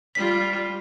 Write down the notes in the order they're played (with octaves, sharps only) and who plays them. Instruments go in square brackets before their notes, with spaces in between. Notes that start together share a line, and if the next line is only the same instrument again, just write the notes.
[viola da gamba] G3 F4 [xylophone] B6